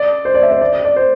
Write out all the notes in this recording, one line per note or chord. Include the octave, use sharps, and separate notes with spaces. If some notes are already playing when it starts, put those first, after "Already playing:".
Already playing: D5
C5
D5
E5
C5
D5
D5
D5
C5